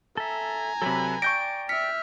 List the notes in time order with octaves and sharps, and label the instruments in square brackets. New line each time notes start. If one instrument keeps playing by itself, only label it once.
[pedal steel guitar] A4 E5 [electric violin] G#5 A#5
[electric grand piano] C3 F#3 [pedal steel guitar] A4 B4 B5
[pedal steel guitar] D5 G5 [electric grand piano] C#6 G6 A#6 [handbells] D7
[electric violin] E5 F6 [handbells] B6 [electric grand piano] C#7